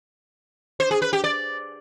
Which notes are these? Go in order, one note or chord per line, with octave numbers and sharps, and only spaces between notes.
C5
G#4
B4
G4
D5